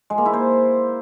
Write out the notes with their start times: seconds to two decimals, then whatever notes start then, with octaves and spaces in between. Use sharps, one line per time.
0.10 G#3
0.18 A#3
0.26 E4
0.33 C5